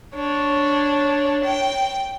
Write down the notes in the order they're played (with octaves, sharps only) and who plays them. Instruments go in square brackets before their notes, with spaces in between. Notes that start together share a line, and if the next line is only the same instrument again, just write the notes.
[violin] D4 [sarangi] C#5
[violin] G5